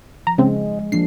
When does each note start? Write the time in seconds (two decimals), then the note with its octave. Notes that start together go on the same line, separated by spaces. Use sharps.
0.27 F3 A#5
0.38 C#3 G#3 C4
0.79 G#3
0.92 F3 A#3 D4 C7